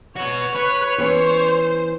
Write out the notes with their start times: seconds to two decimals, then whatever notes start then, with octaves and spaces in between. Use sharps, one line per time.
0.17 F#4 B4 C#5
0.56 B4 C#5
0.98 E3 B3 C#4 C5